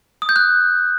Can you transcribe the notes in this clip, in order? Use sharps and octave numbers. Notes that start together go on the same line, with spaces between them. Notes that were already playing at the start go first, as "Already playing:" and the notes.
D#6
G6
F#6